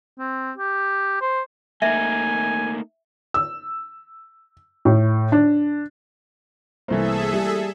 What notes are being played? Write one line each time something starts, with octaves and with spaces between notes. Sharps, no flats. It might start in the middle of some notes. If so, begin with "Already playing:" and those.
C4
G4
C5
A3 A#3 D#4 E5 G#5
E6
A2
D4
C2 E3 A3 A#3 G#4 A4 C5 E5
G3